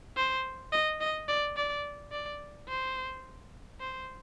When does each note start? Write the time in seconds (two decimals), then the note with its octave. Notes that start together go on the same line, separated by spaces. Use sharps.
0.17 C5
0.73 D#5
1.01 D#5
1.28 D5
1.56 D5
2.12 D5
2.68 C5
3.80 C5